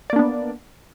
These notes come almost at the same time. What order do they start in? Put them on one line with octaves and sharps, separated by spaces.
D5 A#3 D4 B3